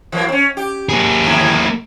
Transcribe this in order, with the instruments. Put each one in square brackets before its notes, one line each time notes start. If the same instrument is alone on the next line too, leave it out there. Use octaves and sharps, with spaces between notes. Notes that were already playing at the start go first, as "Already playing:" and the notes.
[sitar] E3 F#3 A#3
C4 C#4
G4
[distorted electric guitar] A#3 G#4
[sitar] D#2 E4